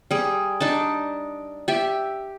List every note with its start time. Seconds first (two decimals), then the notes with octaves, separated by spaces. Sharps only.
0.11 G3 G#4
0.61 D4 D#4 A5
1.68 G4 E5